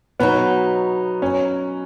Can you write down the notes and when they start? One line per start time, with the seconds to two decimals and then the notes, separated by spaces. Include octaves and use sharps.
0.20 B2 F#3 B3 D#4
1.22 C#4